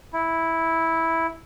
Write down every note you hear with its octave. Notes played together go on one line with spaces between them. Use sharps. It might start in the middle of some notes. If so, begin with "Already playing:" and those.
E4